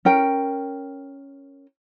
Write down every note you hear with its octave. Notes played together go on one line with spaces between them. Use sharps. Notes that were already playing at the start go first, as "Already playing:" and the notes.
C#4 A#4 G5